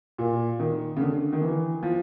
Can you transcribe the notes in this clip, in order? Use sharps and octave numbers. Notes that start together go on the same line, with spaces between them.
A#2
D#3
C#3
D3
D#3
E3
F3